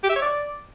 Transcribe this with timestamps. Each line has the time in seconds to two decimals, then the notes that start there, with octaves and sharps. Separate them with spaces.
0.03 G4
0.10 E5
0.16 C#5
0.22 D5